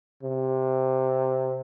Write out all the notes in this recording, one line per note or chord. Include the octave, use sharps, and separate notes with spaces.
C3